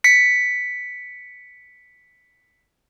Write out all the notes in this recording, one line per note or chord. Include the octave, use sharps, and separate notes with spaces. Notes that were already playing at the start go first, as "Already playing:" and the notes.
B6 C#7